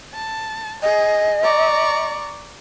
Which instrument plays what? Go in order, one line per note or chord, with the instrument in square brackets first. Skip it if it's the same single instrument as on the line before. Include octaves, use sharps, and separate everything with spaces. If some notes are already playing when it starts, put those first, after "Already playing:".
[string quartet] A5
[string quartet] G#4 [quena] D#5
[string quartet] D5 A#5 C#6